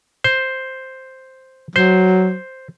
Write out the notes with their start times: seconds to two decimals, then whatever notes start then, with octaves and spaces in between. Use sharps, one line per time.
0.24 C5
1.76 F#3 C5